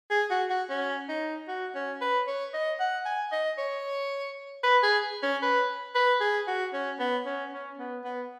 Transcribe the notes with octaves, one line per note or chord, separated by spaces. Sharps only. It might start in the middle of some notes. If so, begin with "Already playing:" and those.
G#4
F#4
F#4
C#4
D#4
F#4
C#4
B4
C#5
D#5
F#5
G#5
D#5
C#5
B4
G#4
C#4
B4
B4
G#4
F#4
C#4
B3
C#4
C#4
B3
B3